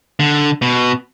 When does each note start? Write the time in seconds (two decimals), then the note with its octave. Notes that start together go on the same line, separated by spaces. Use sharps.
0.20 D3
0.62 B2